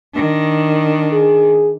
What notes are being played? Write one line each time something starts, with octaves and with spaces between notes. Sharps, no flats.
D#3 D4
G#4